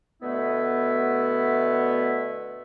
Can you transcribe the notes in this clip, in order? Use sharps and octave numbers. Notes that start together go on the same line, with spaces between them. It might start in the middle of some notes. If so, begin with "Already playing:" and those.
B2 D3 A3 B3 E4